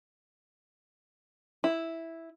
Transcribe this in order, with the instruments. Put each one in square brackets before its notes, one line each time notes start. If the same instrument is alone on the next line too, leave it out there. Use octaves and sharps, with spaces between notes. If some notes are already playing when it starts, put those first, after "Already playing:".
[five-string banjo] E4